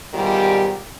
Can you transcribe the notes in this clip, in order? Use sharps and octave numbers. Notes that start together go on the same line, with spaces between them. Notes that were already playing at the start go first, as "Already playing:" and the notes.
G#2 B2 D#3 G3 F4 G4